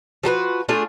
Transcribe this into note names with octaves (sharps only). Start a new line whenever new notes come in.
F3 F#4 A4 B4
A3 D4 F4 G#4